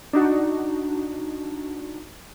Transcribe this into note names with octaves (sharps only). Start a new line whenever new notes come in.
D4 D#4 F#4